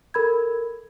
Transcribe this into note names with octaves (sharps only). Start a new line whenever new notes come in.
A4 A#4 B5 G#6